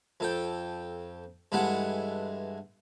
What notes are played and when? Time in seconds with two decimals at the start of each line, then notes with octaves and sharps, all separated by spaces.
0.20 F2 A4 G5
1.52 G2 E3 G#3 A4 F#5